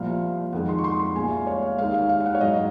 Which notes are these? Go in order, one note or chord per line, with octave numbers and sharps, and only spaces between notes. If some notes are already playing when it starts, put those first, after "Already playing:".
Already playing: C2 A#2 F3 F5
F2 D#3 G#3 F#5
C6
C#6
C6
C6
C2 A#2 G#3 G#5
F5
C#5
F5
D#2 D#3 G#3 F5
F5
F5
F5
F#5
C#5
G#2 F#3 D#5